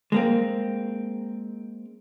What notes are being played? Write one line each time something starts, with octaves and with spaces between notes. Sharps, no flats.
G#3 A#3 C4